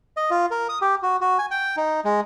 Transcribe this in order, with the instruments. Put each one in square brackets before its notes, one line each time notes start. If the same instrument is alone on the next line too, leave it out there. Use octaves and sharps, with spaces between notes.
[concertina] D#5
F4
A#4
D#6
G4
F#4
F#4
G#5
G5
D#4
G#3